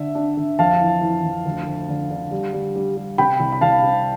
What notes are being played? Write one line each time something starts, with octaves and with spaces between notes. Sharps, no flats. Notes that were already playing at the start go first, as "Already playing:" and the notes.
Already playing: D3 D4 E5
D4
D3
F2 F5 A5
E3
E3
F2
D2
D2
D3
D3
G3
G3
G3
G3
C3 G5 B5
C2
B5
C2 F5 A5
C3